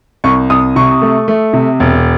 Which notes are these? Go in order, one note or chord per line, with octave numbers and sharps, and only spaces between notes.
C2 C#6
C2 D#6
C3 C#6
A3
A3
C3
E1